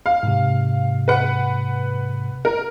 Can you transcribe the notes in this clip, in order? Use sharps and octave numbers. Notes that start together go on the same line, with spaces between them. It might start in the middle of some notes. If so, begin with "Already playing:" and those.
F5
G#2 C3
B4 F#5
A#4